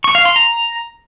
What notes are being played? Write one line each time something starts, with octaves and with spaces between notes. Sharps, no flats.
C#6
F5
C6
A#5